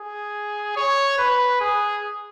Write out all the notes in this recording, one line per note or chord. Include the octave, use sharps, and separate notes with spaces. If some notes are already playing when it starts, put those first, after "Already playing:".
Already playing: G#4
C#5
B4
G#4